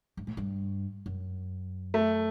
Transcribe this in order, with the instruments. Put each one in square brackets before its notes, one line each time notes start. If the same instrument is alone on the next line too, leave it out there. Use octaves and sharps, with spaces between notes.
[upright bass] G2
A2
G2
F#2
[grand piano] A3